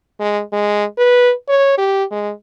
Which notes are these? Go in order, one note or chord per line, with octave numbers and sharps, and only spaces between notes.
G#3
G#3
B4
C#5
G4
G#3